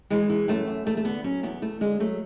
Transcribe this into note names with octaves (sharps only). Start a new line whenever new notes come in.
E3 G#3
E3
F#2 A3
F#2
E2 A3
A3
D3 B3
F#3 C#4
E2 B3
E2 A3
D3 G#3
F#3 A3